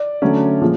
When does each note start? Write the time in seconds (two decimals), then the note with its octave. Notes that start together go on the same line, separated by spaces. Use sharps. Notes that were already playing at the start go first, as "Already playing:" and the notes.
Already playing: D5
0.22 D3 F#3 A3 C#4
0.61 A#2 F3 G#3